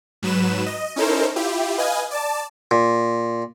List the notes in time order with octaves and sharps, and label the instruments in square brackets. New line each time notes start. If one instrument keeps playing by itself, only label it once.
[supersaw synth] G#2 F#3 B4 E7
D#5
C#4 D#4 E4 A4 A#4 C5
E4 F4 G4
B4 D#5 F5 G#5
D5 A5
[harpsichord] A#2